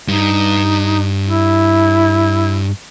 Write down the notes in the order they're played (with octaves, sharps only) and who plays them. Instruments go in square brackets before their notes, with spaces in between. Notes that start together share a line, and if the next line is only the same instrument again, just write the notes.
[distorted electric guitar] G2 [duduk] D#4
[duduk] E4